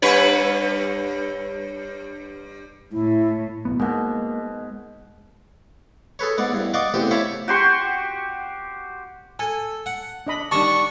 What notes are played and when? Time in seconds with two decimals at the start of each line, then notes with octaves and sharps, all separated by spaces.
0.02 G2 B4 C#5
2.93 A2 E4
3.65 D1 B1 B3
3.80 G#2 B2 G#3 A#3
6.19 G#4 A4 B4 C#5
6.38 G#2 B3 D5
6.52 E2 G2
6.74 D5 D#5 F5 F#5 C#6 D6
6.94 A1 E2 C3 G4 C5 C6
7.11 E4 C#5 F5 A5 B5 D6
7.48 F#4 G4 C6 C#6
9.39 A4 G#5
9.86 F#5
10.27 D4 D#5 B5
10.51 D#3 G3 D4 D5 A5 C#6